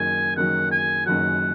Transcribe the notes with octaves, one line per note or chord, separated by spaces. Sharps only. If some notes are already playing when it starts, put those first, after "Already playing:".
Already playing: F#1 F#2 D#3 F#3 G#5
F#1 F#2 D#3 F#3 F#5
G#5
F#1 F#2 D#3 F#3 F#5